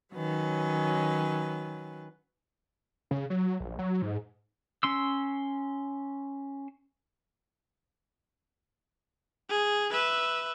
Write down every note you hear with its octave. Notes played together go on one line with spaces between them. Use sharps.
D#3 F#3 C#4 B4
C#3
F#3
A#1
F#3
G#2
C#4 C6 E6
G#4
B4 E5